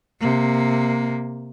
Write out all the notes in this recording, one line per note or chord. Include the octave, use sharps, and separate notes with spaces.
C3 A#3